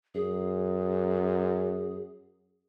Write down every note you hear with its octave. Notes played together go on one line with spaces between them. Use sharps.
F#2 G#4